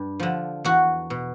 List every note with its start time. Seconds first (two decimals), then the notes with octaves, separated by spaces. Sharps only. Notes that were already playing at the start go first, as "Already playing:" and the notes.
Already playing: G2
0.20 D3 F3
0.64 E2 F#4
1.10 B2